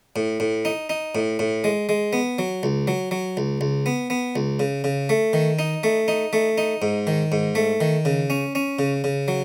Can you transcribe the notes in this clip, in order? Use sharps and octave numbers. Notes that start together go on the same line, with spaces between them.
A2
A2
D#4
D#4
A2
A2
G#3
G#3
B3
F#3
C#2
F#3
F#3
C#2
C#2
B3
B3
C#2
C#3
C#3
A3
D#3
D#4
A3
D#4
A3
D#4
G#2
D#3
G#2
A3
D#3
C#3
C#4
C#4
C#3
C#3
F#3